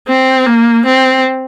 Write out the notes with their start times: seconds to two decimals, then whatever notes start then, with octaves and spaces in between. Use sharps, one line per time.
0.08 C4
0.46 A#3
0.85 C4